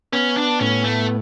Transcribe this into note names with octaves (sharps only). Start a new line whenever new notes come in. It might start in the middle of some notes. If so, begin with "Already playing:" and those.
B3 C#4
D4
A2 C#4
A3